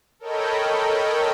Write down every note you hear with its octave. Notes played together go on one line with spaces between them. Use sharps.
A4 A#4 C#5 D#5 G5 B5